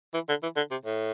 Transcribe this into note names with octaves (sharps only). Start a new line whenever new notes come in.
E3
D3
E3
D3
C3
A2